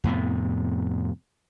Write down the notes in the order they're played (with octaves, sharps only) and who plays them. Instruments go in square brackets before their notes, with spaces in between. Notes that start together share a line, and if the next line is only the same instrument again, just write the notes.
[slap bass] F2 A2 C3 B3